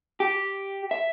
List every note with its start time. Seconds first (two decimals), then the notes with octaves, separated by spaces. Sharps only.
0.20 G4
0.91 E5